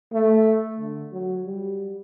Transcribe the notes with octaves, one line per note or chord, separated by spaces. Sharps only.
A3
D3
F#3
G3